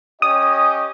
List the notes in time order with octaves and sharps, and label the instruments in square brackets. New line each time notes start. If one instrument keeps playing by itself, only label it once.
[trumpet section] C#4 G4 D#5 [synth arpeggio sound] D#6